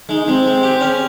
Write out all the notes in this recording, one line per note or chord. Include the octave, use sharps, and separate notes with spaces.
G#3 D#4
G#3 C4
G#3
G4
C#4